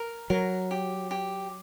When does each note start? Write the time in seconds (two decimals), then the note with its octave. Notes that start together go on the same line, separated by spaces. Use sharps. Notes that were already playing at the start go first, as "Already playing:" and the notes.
Already playing: A#4
0.30 F#3 A#4
0.71 G4
1.11 G4